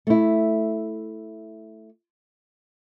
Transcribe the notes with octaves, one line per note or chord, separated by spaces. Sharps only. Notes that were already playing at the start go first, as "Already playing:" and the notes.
A3 E4